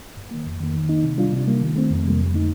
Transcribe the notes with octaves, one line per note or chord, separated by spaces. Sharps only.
G2
D#3 A#3
F2
D#3 A#3
D#3
A#3 D#4
C3
G3 D4 F4
C3
G3 A#3
D#3
A3 C4
F2
C3 G3 A#3
F2
D3 A3 D#4